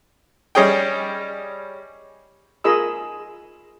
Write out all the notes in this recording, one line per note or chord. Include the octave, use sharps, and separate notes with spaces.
G3 C#4 G#4 D#5 G5
F4 G#4 A#4 D#5 B5 E6